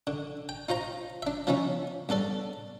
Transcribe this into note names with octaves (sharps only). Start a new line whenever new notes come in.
D3
G5
D#4 F4 C5 A#5
D4 E5
F3 B3 C#4 D#4 E4
G2 B3 A4 D5